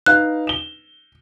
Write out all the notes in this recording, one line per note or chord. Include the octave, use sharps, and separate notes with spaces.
D#4 B4 F5 F#6
E7 G7